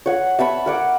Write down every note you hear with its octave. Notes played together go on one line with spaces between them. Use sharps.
C#5 F#5
E5 A5 B5 C#6
A#4 F#5 D6